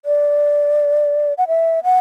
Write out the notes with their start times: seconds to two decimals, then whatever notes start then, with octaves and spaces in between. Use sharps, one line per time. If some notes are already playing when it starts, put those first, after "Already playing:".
0.05 D5
1.38 F#5
1.48 E5
1.84 F#5